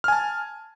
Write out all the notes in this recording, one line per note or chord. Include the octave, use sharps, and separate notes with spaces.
G#5 A5 F6